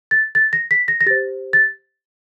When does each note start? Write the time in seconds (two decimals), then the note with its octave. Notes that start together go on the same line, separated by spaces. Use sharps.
0.11 A6
0.35 A6
0.53 A#6
0.71 B6
0.88 A#6
1.01 A#6
1.06 G4 A6
1.10 C5
1.53 A6